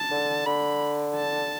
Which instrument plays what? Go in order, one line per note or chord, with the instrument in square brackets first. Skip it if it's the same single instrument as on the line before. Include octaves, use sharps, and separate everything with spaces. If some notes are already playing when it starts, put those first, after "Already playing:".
Already playing: [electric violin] A5
[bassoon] D3
[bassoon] D3 [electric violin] B5
[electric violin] A5